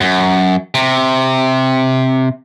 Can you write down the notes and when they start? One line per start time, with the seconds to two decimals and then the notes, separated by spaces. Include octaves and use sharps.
0.01 F#2
0.74 C3